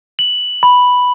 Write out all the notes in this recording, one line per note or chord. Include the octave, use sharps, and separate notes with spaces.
F#7
B5